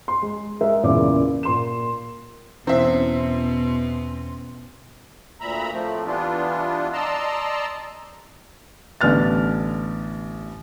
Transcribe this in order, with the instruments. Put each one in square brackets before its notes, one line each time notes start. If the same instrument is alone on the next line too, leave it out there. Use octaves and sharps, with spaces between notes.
[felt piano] C6
G#3
G#3 A#4 E5
E2 A#2 C#3 D5 E5 D6
A#2 C6 E7
[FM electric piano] E2 C#4 C6 [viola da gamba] B2 [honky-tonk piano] C4 E5 [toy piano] E4 C5
[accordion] D2 A#2 E5 A#5 B5
A2 F3 A3 C4
E3 G3 B3 D4 F4
D5 D#5 A5 A#5 C6 E6
[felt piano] A1 D3 B3 F6 A6